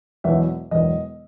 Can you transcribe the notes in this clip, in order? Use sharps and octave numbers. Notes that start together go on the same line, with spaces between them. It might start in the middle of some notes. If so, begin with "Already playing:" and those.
E1 E2 B2 F#3 E5
E1 E2 B2 F#3 D#5